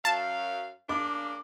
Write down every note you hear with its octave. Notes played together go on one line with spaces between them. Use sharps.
F#2 F5 A5
C#3 A#3 D4 D6